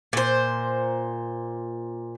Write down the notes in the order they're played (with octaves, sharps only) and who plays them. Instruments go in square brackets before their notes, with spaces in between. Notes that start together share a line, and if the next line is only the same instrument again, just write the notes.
[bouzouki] A#2 C5